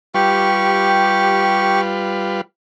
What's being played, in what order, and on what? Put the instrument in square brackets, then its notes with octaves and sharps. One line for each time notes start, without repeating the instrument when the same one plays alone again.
[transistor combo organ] G3 F4 B4 [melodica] G4 C#6